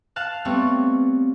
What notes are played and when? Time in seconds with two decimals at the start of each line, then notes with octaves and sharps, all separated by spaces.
0.16 F5 A5 F#6
0.45 G3 A3 B3 C4 C#5